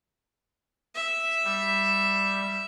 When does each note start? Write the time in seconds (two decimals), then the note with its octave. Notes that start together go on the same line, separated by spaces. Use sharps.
0.95 E5
1.45 G3